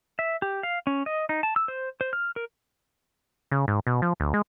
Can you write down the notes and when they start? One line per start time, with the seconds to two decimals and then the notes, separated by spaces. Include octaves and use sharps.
0.19 E5
0.42 G4
0.63 F5
0.87 C#4
1.06 D#5
1.29 D#4
1.43 A5
1.56 E6
1.68 C5
2.01 C5
2.13 F6
2.36 A#4
3.51 C#3
3.68 G#2
3.87 B2
4.02 F3
4.20 D2
4.34 G#3